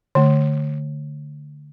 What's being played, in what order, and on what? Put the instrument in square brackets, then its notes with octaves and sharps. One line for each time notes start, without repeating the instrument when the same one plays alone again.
[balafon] D3 A3